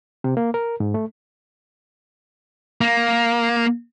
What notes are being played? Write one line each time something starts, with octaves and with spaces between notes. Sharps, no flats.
C3
A#3
A#4
G#2
A3
A#3